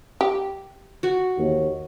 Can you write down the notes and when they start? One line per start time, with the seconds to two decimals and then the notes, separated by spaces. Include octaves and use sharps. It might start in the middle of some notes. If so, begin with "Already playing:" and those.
0.21 G4
1.03 F#4 F#5
1.38 D#2